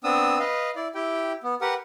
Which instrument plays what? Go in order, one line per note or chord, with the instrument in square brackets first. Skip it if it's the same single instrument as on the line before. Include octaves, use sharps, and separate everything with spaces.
[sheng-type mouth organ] B3 C4 D4 D#6 E6
B4 D#5 F5
E4 D5
E4 G4 G5
B3
G4 A#4 B4 F#5